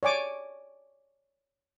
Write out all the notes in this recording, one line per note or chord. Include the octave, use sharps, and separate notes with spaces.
C#5 D5 G#5 D6